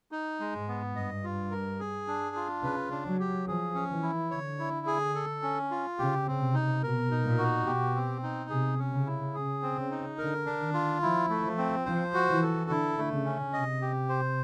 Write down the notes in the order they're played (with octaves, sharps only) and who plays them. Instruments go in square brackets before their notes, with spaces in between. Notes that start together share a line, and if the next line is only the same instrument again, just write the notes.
[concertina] D#4
G#3
[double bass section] G#2
[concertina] B3
[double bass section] G2 [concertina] D#5
[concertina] F4
A#4
G#4
D4
F4
[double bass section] C#3 [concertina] B4
[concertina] D4
[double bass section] F#3
[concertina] G4
[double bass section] F3 [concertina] G#4
[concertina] C#4
[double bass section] E3
[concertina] E4
[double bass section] D3 [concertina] C#5
[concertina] E4
G#4
A4
C#4
F4
[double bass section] C#3 [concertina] G4
[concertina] C4
[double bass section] C3
[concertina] D#4
[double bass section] B2 [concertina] A#4
[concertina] D#4
[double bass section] A#2
[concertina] F#4
[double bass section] B2 [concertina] G4
[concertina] C4
D#4
[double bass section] C3 [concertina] G#4
[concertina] C#4
[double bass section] C#3
[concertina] E4
[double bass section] C#3 [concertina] G#4
[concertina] C4
[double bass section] C#3
[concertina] D#4
[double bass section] D3 [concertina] A#4
[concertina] D4
[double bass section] D#3
[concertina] F4
[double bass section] F3 [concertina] E4
[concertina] A3
[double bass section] F3
[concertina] C4
[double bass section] F3 [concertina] C5
[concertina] F#4
[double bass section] E3
[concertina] A4
[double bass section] D3 [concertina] E4
[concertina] A3
[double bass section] C#3
[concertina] C#4
[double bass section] C3 [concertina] D#5
[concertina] G4
C5